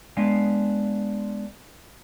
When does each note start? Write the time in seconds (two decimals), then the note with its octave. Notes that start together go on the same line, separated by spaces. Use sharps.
0.17 G#3 B3 D4 F5 G#5